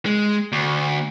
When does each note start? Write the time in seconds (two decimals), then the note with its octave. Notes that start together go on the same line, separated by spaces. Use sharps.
0.06 G#3
0.52 D2